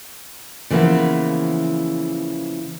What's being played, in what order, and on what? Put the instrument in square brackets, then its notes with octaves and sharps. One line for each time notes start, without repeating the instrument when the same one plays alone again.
[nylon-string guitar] C#3 E3 F3 A#3 B3